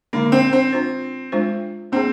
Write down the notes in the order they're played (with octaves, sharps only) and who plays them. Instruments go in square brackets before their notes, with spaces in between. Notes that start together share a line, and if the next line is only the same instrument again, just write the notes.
[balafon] D3 G#3 D#4 [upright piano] A#3
[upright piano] C4
C4
[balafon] D4 F4 C5
G#3 D4 F4 C5
[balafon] A#3 D4 G#4 [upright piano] C4